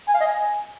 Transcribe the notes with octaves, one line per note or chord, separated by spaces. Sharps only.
G#5
F5
D#5
G#5